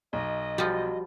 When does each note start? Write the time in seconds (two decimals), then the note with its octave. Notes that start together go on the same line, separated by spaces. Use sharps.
0.13 B1 D#5
0.58 F3 G3 F#4